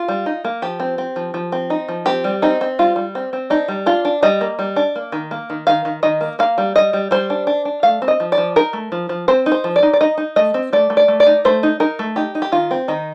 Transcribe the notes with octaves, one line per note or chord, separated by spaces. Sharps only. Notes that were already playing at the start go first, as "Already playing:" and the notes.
Already playing: F4
G3
D#4
A#3
F3 G4
C4
C4
F3
F3
C4
D#4
F3
C4 G4
G3
C4 D#4
C4
G3 F4
G3
C4
C4
D4 D#4
G3
D4 F4
D4
G3 D#5
A#3
G3
D4
A#3
D#3
A#3
D#3
D#3 F5
D#3
D#3 D#5
A#3
A#3 F5
G3
G3 D#5
G3
G3 C5
D4
D4
D4
A3 F5
C4
D#5
F3
D5
F3
D#4 A#4
A3
F3
F3
C4 C5
D#4
C5
F3
D5
D#4
D5
D#4 D#5
D#4
A3 D#5
C4
A3 D5
A3
D5
A3
D5
D#4
A3 C5
D#4
D#4 A#4
A3
D#4 G4
D#4
G4
D#3 F4
C4
D#3 D#4